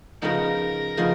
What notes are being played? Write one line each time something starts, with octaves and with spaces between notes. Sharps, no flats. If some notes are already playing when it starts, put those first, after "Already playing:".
C#3 F3 B3 D#4 A#4
C#3 F3 B3 D#4